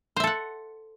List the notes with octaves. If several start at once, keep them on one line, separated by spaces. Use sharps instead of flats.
A4 C5 E5 F#5